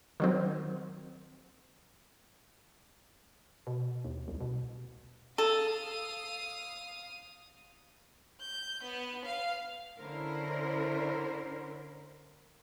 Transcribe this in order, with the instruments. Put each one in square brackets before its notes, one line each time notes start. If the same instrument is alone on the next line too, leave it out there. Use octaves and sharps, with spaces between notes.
[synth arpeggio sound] D#3 F#3 C4
[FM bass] B2
D#2
C2
B2
[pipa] A4 [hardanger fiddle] F5 D#6
[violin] G6
B3
F5
[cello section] D3 C#4 E4 A#4 C5